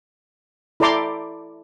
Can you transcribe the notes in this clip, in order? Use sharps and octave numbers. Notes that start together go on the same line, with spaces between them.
E4 A4 D5 A#5 C6 D6